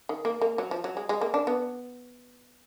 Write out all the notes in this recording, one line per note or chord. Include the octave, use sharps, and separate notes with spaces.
D#3
A#3
A#3
F#3
F3
F#3
G#3
G#3
A#3
D4
B3